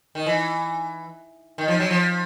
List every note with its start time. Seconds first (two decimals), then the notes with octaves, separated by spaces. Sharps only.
0.15 D#3
0.26 E3
1.58 D#3
1.68 F3
1.80 F#3
1.91 F3